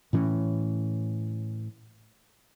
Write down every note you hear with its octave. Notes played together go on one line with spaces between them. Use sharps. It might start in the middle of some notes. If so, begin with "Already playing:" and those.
A2 E3 C#4